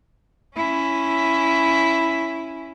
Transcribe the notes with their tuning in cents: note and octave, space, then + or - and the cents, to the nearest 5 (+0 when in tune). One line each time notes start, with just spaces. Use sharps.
C#4 +0 E4 +5